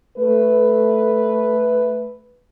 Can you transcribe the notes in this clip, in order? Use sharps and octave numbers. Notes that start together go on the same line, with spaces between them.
A3 B4